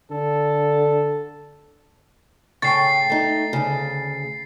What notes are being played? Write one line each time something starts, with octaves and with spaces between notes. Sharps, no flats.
D3 A4
A2 C#3 G5 A5 C#6 A6 C7
A3 D#4
D2 C#3